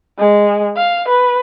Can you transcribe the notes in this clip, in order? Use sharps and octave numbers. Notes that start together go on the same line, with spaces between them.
G#3
F5
B4